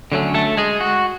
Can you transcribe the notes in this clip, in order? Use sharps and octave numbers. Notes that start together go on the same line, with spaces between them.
D3 F#3 A3 C#4
A3 A4
G#3 G#4
F#4